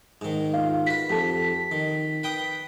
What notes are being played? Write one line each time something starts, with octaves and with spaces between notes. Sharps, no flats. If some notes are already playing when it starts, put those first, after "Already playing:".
G#2 D#3
F4 F5
F#4 B4 B6
F2 G4 A4
D#3
B4 G5 D#6